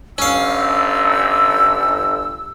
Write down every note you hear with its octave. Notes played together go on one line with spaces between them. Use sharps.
G1 C#4 F5 E6